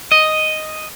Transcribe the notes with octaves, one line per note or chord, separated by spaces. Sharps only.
D#5